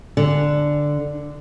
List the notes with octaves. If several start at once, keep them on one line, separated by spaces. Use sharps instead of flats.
D3